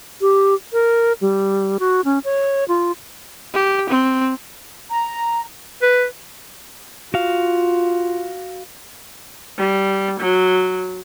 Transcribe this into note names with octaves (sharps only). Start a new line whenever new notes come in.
G4
A#4
G3
F#4
C#4
C#5
F4
G4
C4
A#5
B4
F4 F#4 F5
G3
F#3